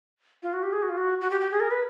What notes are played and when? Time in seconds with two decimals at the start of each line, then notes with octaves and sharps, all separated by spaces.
0.43 F4
0.53 F#4
0.63 G4
0.73 G#4
0.82 F#4
0.89 F4
0.97 F#4
1.21 F#4
1.31 G4
1.41 G4
1.51 G#4
1.60 A#4
1.71 B4